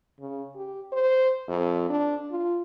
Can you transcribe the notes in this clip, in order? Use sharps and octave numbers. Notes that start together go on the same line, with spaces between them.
C#3
G4
C5
F2
D4
F4